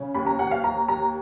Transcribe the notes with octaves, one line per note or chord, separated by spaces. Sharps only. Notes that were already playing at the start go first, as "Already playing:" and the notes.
Already playing: C#3
D#2 B5
A#5
D#2 F#5
F5
D#2 A#5
D#2 A#5